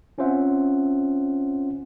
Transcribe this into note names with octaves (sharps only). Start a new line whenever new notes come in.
C4 C#4 F4 C5 E5 F#5